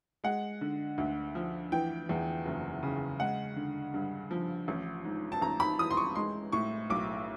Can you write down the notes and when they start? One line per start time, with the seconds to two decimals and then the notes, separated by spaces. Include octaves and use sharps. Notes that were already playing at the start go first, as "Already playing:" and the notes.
0.24 G#3 F#5
0.61 D3
0.98 D2
1.35 F3
1.72 E3 G5
2.09 E2
2.46 F#1
2.83 C#3
3.20 G#3 F#5
3.57 D3
3.94 G2
4.31 F3
4.68 A1
5.04 G#2
5.32 A5
5.41 A1 A#5
5.60 B5
5.79 E3 D#6
5.91 C6
5.97 C#6
6.15 G#3 C6
6.52 A2 C#6
6.90 B1 D6